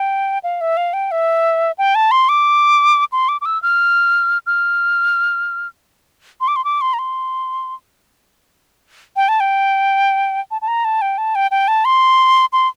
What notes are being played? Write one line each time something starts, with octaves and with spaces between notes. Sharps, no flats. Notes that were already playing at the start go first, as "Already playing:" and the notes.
Already playing: G5
F5
E5
F5
G5
E5
G5
A5
C6
D6
C6
D6
D6
E6
F6
F6
C6
D6
C6
D6
C6
A#5
C6
G5
A5
G5
A5
A5
A#5
A5
G5
A5
G5
G5
A5
C6
C6